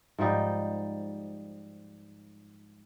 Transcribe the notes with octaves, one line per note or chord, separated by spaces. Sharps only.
G#2 F3 G3 D#4